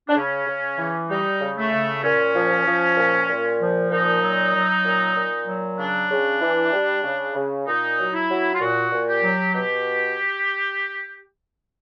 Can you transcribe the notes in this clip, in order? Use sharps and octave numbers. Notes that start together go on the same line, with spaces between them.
D4
C#3 C#4
C#3
E3
G3 D#4
C#3
A3
C#3
A#2 C#4
F3
F3
A#2
A#2
F3
A#2 D#4
F#3
F#3
A#2
A#2
F#3
C#3 D4
C#3
E3
G3
C#3
C#3
A#2 D#4
F#3
E4
F#3
F4
A#2 F#4
A#2
G4
F#3
B2 G4